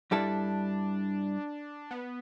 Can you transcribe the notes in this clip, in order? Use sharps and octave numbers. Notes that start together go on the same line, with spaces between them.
G2 G3 D4 E4 A4
B3